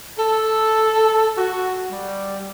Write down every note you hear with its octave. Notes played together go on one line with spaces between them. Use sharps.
A4
F#4
G3